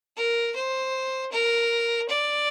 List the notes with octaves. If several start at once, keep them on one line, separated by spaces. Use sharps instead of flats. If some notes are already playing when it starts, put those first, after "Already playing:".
A#4
C5
A#4
D5